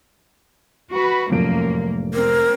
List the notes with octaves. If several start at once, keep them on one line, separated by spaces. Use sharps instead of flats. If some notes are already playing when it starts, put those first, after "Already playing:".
F#4 B4
F1 F#2 A2 F3 A#3 D7
C4 A#4